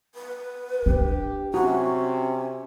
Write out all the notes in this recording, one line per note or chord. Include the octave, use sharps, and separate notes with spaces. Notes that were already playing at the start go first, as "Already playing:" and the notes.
B4
D4 G4
C3 C#4 F#4